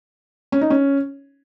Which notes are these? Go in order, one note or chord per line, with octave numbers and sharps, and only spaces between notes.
C#4
D#4
C#4